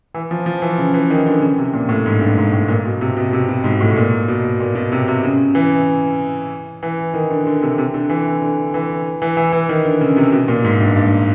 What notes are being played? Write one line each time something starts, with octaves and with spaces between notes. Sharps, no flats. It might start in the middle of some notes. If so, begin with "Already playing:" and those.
E3
F3
F3
E3
C#3
E3
D#3
D3
C#3
C3
A#2
A2
G#2
G2
G#2
A2
A#2
B2
C3
B2
C3
B2
G#2
A2
A2
A#2
B2
A#2
B2
C3
C3
C#3
E3
E3
D#3
D3
D3
C3
C3
D3
E3
D3
E3
E3
E3
E3
D#3
D3
C#3
C3
B2
A#2
G#2
G2
G2